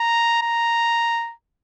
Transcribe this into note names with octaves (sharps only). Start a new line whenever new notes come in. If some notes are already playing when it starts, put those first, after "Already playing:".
Already playing: A#5
A#5